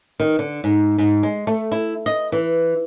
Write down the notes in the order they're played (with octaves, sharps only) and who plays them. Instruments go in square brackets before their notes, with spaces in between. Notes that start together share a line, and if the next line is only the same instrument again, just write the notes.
[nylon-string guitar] D#3
D3
G#2
G#2
G#3
A3
E4
D#5
E3